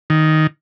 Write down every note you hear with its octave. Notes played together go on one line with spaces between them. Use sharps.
D#3